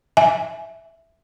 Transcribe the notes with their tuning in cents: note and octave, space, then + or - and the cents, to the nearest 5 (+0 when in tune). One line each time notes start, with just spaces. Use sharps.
E5 +0 G#5 +0